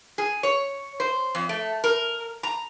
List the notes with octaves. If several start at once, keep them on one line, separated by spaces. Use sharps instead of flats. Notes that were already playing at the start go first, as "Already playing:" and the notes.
G#4
C#5
C5
F2
A3
A#4
A#5